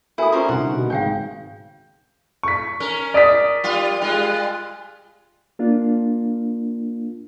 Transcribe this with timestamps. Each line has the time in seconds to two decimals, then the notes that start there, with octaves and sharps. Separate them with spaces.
0.18 E4 F#4 A4 A#4 G#5 D#6
0.32 C#4 F4 A#4 C5 D5 C#6
0.49 C2 D3 D#4 F#5
0.74 B2 F#4
0.90 G#1 C#3 F5 G5 G#5 G6
2.43 C#6 B6
2.80 C#4 A#4
3.14 D5 D#6 B6
3.64 G3 F4
4.02 G3 G#3 F4
5.59 A#3 D4 F4